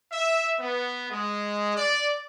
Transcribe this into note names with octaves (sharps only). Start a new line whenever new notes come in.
E5
B3
G#3
D5